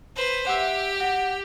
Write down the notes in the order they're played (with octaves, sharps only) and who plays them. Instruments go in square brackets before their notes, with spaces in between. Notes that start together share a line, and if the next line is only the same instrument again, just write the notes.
[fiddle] B4 C5
[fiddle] G4 [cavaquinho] E5 F#5
[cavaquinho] F#4 G5